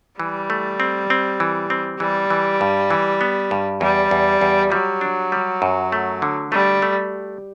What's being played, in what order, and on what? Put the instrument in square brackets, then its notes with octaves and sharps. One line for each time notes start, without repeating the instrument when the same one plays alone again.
[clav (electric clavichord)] E3 [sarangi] G3
[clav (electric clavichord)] A3
C4
C4
E3
C4
[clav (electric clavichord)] E3 [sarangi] G3
[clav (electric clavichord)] E3
G2
E3
B3
G2
[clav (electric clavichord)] E2 [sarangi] G3
[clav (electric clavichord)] E2
E2
[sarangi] F#3 [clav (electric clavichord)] G3
[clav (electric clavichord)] D4
G3
F#2
A3
D3
[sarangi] G3 [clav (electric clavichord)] A3
[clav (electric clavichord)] A3